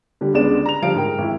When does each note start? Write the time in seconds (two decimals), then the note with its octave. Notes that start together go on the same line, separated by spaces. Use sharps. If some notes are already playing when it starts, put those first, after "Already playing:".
0.21 D3 G3
0.34 C#2 D3 G#3 B3 D5 E7
0.66 A#5 F7
0.82 D3 F3 G3 F5 D7
0.95 G#2 A#4 G5
1.18 G#1 E4